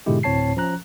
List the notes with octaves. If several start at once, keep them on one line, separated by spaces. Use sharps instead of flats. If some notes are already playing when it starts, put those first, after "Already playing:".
G#2 B2 D3 G#3 E4 G4
D2 A2 C4 C#5 A5 C7
F3 C#4 A#5 F#6